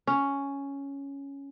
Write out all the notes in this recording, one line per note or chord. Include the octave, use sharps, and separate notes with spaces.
C#4